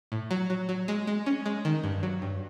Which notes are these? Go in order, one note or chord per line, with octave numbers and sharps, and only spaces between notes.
A2
F#3
F#3
F#3
G#3
G#3
C#4
G#3
D#3
G2
F#3
G2